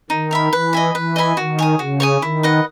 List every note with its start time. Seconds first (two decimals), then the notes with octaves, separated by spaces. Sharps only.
0.10 D#3 D#4
0.31 A#4 E5 B5
0.53 E3 B4
0.73 D#5 G#5 B5
0.95 E3 B4
1.16 D#5 G#5 B5
1.37 D#3 F#4
1.59 C#5 G#5 D#6
1.79 C#3 F#4
2.00 C#5 G#5 D#6
2.22 D#3 E4
2.43 B4 D#5 F#5